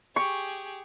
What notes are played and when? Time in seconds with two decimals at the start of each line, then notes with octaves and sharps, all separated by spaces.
0.16 G4 G#4 C#6